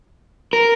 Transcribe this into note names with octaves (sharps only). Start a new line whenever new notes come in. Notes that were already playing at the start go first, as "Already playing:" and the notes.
A#4